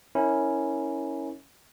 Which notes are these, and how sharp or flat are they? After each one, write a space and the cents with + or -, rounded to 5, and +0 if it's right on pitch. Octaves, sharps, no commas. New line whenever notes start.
C#4 +0 E4 -25 A#4 +0